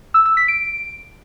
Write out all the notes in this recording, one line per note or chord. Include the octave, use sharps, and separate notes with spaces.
E6
E6
B6
D7